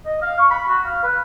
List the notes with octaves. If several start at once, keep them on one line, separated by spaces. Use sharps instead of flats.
D#5
F5
C#6
B5
F#4
F5
B4